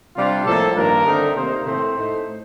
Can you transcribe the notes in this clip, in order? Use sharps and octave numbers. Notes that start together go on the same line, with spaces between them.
C3 G3 D4 F4
A2 F3 A#3 A4
G2 D#3 A#3 D4 A#4
D3 A3 C4 D#4
C3 D#3 A#3 D#4 C5
A2 A3 C4 C5
A2 A3 D#4